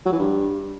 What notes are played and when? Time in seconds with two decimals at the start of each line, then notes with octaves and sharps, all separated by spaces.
0.06 F#3
0.12 E3
0.19 G2